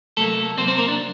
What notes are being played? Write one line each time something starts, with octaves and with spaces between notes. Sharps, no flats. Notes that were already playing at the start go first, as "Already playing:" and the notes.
C3 F#3 A3 A#3 A4
C3 F#3 A#3 C4 C5
C4 C5
A#3 A#4
D4